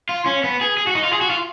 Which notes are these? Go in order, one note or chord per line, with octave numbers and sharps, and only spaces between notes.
F4
C#4
B3
G#4
G#4
F#4
D#4
F4
G#4
F#4
F4